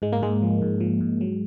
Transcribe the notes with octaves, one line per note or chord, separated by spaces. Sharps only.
G#2 G#3
A#3
G#2 G#3
F3
G#2
F3
G#2
F#3